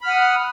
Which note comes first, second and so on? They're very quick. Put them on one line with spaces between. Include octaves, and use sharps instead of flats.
B5 F6 F#5 D#6